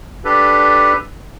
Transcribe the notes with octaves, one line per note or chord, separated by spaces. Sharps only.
D4 G4 A4 B4